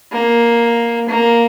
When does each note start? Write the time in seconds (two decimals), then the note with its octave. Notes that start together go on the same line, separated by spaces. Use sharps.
0.12 A#3
1.09 A#3